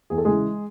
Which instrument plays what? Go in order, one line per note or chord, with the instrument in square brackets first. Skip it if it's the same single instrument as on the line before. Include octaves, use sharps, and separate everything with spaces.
[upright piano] E2 G#4
A4
C#3 E3 G#3 G#4